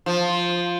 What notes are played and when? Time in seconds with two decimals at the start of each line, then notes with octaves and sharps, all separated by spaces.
0.06 F3